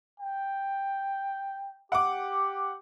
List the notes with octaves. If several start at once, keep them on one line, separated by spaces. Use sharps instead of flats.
G5
G4 F#5 D6